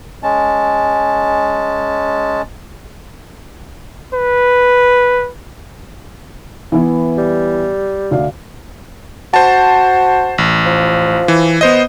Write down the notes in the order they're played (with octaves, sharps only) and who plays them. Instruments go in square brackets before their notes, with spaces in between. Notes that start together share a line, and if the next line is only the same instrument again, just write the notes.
[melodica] G#3 C#4 A5
[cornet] B4
[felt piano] E3 B3 E4
[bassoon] G3
[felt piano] D2 D5 F5
[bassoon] F#4 [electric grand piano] C5 A5
[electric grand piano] A1
[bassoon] F3
[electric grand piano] E3
B3 C5 D#5